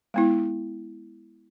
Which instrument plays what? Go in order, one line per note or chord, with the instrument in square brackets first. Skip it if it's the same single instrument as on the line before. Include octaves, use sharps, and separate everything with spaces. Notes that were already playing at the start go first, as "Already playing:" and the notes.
[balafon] G#3 B3 E4